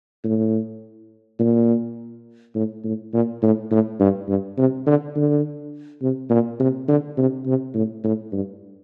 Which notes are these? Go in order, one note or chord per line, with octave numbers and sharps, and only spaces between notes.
A2
A#2
A2
A2
A#2
A2
A2
G2
G2
C3
D3
D3
C3
A#2
C3
D3
C3
C3
A2
A2
G2